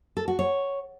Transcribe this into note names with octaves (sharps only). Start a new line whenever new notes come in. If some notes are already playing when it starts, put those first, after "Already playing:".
A4
F#4
C#5